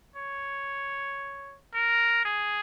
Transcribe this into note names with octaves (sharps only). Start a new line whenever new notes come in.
C#5
A#4
G#4